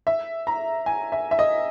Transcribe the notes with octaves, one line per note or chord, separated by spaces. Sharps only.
E5
A#5
G#5
E5
E5
D#5